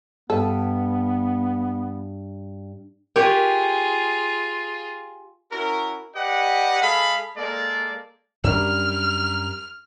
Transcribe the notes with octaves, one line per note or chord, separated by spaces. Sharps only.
G2 B3 A4
F4 G4 G#4 A#4 B4 C#5
C#4 E4 F#4 A#4
G4 B4 D5 D#5 F#5
G#3 G#4 A4 F5 B5
G#3 A#3 A4 D5
F#2 G3 C#4 D4 A#4 F6